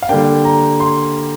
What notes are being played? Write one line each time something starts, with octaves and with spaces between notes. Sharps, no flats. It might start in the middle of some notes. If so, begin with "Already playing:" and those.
F5
D3 G3 A#3 D4 G5
A#5
C6